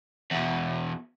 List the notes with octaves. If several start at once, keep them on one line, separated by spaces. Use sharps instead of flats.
E2 B2